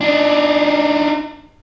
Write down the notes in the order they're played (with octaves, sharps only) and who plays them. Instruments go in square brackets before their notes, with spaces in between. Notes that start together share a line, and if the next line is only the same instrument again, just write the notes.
[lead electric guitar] D4 D#4